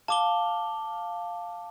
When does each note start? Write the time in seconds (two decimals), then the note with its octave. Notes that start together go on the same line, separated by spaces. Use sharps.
0.08 F5 A5 D6 G7